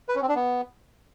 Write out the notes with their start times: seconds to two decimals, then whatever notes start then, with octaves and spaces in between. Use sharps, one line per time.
0.09 B4
0.15 C#4
0.22 C4
0.29 D4
0.35 B3